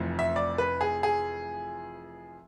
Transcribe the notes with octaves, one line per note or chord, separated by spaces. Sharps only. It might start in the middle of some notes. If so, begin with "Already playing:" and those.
Already playing: F1 F2 E3 A3
E5
D5
B4
G#4
G#4